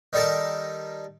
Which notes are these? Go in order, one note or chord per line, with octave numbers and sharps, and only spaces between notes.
D#3 G3 D#4 A4 A#4 A5